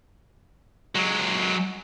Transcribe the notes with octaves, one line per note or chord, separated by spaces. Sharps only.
F#3 G#3